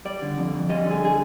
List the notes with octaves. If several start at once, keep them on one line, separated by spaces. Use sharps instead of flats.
G3 D5
D3
F2
F2
G3 D#5
D3 G#4
G#4